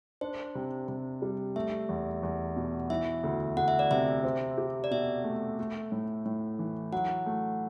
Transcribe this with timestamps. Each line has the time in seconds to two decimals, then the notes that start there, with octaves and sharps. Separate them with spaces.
0.21 D4 C5
0.55 C3
0.88 C3
1.22 G3
1.56 A3 E5
1.89 E2
2.23 E2
2.56 B2
2.90 E3 E5
3.23 D2
3.57 D2 F#5
3.68 E5
3.79 D5
3.91 C3 E5
4.24 C4
4.58 G4
4.84 D5
4.91 B2 E5
5.24 A3
5.59 A3
5.92 A2
6.25 A2
6.59 E3
6.92 F#3 F#5
7.26 A3